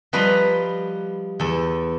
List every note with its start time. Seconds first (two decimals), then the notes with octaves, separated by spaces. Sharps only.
0.13 F3 G3 B4 D#5 A#5 C6
1.40 E2 A4